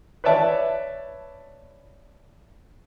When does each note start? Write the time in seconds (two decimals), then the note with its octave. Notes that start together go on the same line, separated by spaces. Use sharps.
0.24 B4 C#5 D5 E5 A5